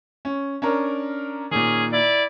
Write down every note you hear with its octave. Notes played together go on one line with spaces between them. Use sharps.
C#4
C#4 D4 A#4
A#2 D#3 C#4 G#4
E4 D5